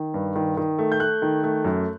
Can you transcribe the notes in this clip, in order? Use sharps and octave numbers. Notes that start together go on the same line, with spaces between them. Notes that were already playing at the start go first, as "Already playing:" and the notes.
Already playing: D#3
G2
D#3
D#3
A3
G6
A3 F#6
D#3
A3
F#2